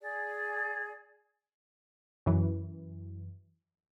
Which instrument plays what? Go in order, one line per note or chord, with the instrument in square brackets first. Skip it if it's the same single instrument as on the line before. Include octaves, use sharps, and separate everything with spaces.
[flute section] G#4 D5
[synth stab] F#2 E3